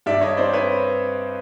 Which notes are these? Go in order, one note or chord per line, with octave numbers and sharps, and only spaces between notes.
G2 D5 E5
C#5 D#5
C4 C5 D5
B4 C#5